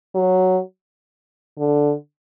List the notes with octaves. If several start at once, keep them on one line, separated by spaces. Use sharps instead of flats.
F#3
D3